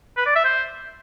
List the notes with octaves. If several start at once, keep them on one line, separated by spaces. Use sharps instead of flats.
B4
D5
E5
C5